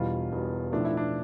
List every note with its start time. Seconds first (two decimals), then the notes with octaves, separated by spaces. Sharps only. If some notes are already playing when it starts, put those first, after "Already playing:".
Already playing: E1 E2 B2 G3 F4
0.32 E1 E2 B2 G3
0.72 B1 A2 F3 A3 D4
0.85 E4
0.97 D4